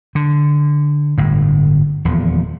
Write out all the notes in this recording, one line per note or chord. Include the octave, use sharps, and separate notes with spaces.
D3
G1 A2
D#1 E2 F3